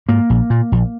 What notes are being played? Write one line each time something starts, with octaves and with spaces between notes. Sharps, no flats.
G#2 A#3
A#1
A#2
A#1